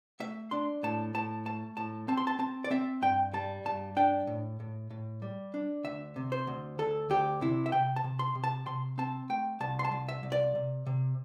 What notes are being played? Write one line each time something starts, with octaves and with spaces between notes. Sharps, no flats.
A3 E5
D4 C6
A2 A5
A2 A5
A3 A5
A2 A5
C4 A5
C6
A5
C4 A5
D5
C4 E5
G2 G5
G3 A5
G2 A5
D4 G5
A2
A2
A2
G3
D4
D2 E5
C3
C5
D2
D2 A4
D2 G4
C3 E4
E5
C3 G5
A5
C3
C6
C3
A5
C3 C6
C4 A5
A3 G5
C2 A5
C6
A5
C2
E5
C2
D5
C3
C3